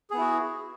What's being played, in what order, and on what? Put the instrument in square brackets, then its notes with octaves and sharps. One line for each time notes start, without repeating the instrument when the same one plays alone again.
[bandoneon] G#4
B3
E4
F#4